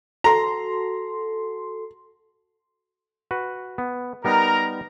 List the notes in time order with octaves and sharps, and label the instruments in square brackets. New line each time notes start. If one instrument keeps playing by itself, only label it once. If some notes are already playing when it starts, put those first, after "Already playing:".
[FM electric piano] F#4 A4 C6 [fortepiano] A#5
[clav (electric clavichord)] F#4 B4
B3
[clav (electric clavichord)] G3 B3 D#4 [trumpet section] A#4 A#5